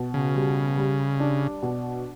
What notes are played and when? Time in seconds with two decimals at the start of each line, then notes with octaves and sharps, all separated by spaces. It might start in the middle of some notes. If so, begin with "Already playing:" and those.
Already playing: B2
0.14 C#3
0.35 G3
0.77 G3
1.20 D4
1.62 B2